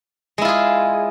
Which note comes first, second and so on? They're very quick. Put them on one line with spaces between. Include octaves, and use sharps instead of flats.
G#3 E4 F4 G#4